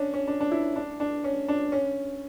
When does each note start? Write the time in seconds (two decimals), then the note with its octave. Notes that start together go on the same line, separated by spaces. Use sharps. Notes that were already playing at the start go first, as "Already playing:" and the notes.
Already playing: C#4 D4
0.14 C#4
0.28 D4
0.41 D4
0.51 E4
0.76 D4
1.00 D4
1.24 C#4
1.48 D4
1.72 C#4